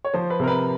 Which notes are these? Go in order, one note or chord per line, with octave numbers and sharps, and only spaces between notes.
C#5
F3 C5
B4
C3 A#4
B4